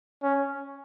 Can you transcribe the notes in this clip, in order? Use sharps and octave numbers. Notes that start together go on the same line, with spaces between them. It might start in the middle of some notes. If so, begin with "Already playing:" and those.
C#4